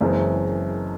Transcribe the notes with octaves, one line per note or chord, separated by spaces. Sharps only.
F#1 F#2 E3 G#3 C4